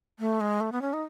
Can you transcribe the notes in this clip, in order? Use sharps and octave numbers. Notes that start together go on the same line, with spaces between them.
A3
G#3
A3
B3
C#4
D#4